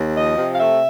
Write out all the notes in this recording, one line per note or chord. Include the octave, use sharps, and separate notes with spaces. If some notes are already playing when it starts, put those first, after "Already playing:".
Already playing: D#2
F3 D#5
C3
F5
A3 E5